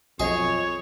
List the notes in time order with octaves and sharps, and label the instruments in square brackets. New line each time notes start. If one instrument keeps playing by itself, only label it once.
[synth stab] B1 F#3 D#5 [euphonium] F2 [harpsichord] G#4 [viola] C#5